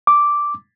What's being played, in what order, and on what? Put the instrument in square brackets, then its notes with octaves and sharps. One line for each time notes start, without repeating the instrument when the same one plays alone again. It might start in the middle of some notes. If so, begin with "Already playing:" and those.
[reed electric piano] D6